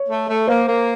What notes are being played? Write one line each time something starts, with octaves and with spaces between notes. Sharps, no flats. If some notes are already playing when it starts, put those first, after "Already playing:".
Already playing: C#5
A3
A3
A#3 C5
A#3